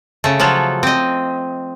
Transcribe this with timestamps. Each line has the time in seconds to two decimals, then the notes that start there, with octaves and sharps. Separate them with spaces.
0.24 C#3 A3
0.39 F3 F#3 F4 A4
0.83 C4 D#5